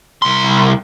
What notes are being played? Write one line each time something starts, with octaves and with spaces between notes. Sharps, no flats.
C2 C6